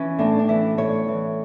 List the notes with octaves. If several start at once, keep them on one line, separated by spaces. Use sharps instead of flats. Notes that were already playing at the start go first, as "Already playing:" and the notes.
Already playing: E3 C#4
A2 D4
D4
E3 E4
A2 C#5
E3